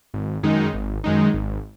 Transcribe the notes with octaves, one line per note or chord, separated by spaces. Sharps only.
G#1
F#2 D#3 G#3 D#4
G#1
F#2 D#3 G#3 D#4
G#1